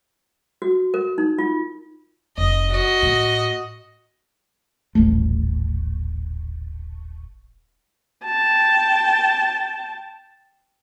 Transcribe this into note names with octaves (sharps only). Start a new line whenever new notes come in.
F#4
A#4
D#4
F4
F1 D#5
F#4 D#5
A2
D#1 A1 A3
G5 A5